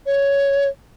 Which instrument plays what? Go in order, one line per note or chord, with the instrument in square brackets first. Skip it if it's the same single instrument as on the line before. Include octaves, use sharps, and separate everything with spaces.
[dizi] C#5